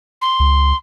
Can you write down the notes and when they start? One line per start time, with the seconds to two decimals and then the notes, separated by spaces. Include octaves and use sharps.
0.21 C6
0.40 C#2